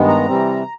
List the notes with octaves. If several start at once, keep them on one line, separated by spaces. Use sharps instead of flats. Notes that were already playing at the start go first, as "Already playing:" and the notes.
Already playing: G2 D#3 G#3 B3
A#5
C3 E3 G3 C4